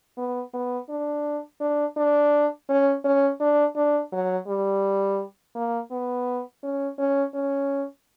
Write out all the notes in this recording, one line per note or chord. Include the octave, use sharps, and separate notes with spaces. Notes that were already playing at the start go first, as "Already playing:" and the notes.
B3
B3
D4
D4
D4
C#4
C#4
D4
D4
F#3
G3
A#3
B3
C#4
C#4
C#4